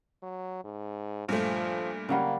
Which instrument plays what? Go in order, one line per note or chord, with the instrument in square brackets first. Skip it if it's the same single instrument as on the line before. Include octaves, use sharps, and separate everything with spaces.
[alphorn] F#3
G#2
[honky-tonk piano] G2 A#2 A3 [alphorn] F3
[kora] C#3 F#3 G3 [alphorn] A#3